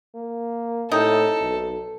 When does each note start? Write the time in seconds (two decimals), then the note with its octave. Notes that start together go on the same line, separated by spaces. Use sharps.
0.15 A#3
0.91 A2 C3 D#4 A4
1.41 B1